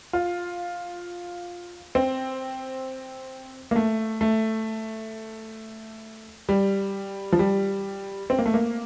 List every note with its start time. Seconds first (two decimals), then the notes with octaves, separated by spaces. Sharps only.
0.13 F4
1.95 C4
3.71 A#3
3.76 A3
4.21 A3
6.49 G3
7.32 F3
7.39 G3
8.30 C4
8.39 A#3
8.46 A3
8.54 A#3